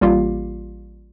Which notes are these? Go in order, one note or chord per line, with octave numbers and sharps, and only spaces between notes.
A1 G3 A#3 F4 G4 F5